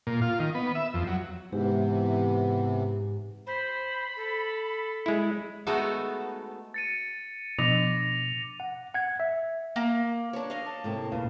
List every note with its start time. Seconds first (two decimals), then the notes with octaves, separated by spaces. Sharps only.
0.07 A#2
0.22 F4
0.39 D#3
0.55 B3
0.75 E5
0.94 F2
1.07 F#3
1.52 G#2 C3 E3 B3 G4
3.47 C5 B5
4.16 A4
5.06 G#3 E4
5.67 G#3 A3 B3 D#4 F#4 A4
6.74 A6 C#7 D#7
7.59 B2 F3 D4 D6 A#6 F7
8.60 F#5
8.94 F#5 G#6
9.20 E5
9.76 A#3
10.33 D4 C#5
10.50 D#5 F5
10.66 A5
10.84 A2 C3 A#3
11.12 A#2 C#3 B4 F5